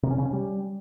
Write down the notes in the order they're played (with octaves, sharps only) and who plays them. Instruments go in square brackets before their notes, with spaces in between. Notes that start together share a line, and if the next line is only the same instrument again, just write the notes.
[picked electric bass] C3
C#4
C#3
C#4
G3